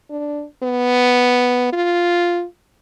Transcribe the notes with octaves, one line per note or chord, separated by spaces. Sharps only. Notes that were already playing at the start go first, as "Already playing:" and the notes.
D4
B3
F4